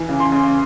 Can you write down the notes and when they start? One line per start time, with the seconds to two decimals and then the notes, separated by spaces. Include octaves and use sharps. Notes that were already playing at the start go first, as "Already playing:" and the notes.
Already playing: E3
0.09 C#3
0.20 C6
0.32 C#3